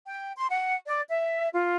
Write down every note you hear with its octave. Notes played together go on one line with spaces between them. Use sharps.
G5
C6
F#5
D5
E5
F4